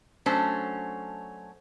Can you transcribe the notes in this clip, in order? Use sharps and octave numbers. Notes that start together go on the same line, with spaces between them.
F#3 A3 C#4 D4 C5